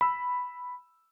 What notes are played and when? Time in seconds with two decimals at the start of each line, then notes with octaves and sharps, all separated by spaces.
0.01 B5 E6